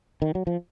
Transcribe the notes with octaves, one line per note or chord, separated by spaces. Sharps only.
D#3
F#3
F3